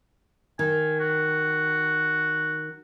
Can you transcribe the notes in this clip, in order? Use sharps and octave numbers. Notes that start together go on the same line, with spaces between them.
D#3 G#5
F#4